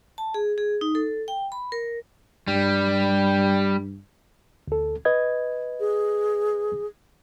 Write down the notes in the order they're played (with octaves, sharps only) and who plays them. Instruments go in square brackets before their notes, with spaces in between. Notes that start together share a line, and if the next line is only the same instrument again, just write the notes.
[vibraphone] A5
G#4
G#4
D#4
A4
G5
B5
A#4
[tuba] G2 [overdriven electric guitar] G3
[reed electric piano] D2 A4
B4 D#5 G#6
[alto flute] G#4